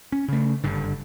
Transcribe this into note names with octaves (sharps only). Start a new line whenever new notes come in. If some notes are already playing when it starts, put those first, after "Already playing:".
C#4
C#3 A3
F#1 G2 D3